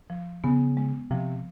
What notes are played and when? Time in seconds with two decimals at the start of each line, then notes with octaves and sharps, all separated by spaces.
0.10 F3
0.44 C#3 B3
0.77 G#3
1.11 C3 F3